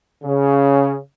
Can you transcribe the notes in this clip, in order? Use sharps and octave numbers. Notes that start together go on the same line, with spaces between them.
C#3